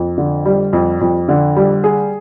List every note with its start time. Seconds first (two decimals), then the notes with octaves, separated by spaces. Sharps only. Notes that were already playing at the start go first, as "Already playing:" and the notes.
Already playing: F2
0.18 D3
0.46 G3
0.73 F2
1.01 F2
1.28 D3
1.57 G3
1.84 G#4